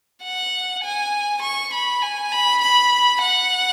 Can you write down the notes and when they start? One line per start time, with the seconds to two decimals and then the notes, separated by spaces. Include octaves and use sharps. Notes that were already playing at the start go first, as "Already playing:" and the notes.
0.24 F#5
0.83 G#5
1.42 C#6
1.73 B5
2.02 G#5
2.31 B5
2.61 B5
3.21 F#5